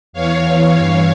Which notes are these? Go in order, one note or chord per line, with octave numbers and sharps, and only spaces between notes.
E2 E3 C#5 F5
C#5 F5
G2 E3